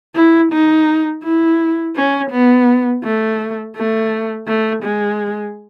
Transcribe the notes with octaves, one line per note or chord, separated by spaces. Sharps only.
E4
D#4
E4
C#4
B3
A3
A3
A3
G#3